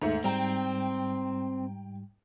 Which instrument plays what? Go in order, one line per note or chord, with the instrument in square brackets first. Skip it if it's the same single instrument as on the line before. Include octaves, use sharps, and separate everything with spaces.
[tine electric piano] D#2 [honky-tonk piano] G#2 A3
[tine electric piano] G#2 G3 [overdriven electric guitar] C4 [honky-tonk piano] G5 A#5